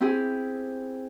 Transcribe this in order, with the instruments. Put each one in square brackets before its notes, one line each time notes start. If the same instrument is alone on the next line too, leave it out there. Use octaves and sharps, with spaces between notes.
[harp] C4 E4 G4 G#4